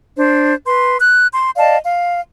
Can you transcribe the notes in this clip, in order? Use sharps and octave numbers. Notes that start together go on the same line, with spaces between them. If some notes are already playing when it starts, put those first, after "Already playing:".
D4 C5
B4 C6
F#6
C6
D5 D#5 F5 A5
F5